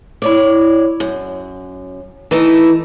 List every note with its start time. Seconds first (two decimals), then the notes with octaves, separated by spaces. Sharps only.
0.22 E4 C#5 D5
1.00 F#2
2.31 E3 A3 D#4 E4